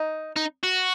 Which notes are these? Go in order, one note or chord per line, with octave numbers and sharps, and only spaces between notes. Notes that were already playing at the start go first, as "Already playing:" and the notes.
Already playing: D#4
D#4
F#4